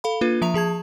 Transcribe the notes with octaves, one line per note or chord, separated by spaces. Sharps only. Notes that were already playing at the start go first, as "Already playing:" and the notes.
A4 F5 B5
A#3 D4 F4 B4
F3 E5 A#5 F7
F3 G#4 A5 G#6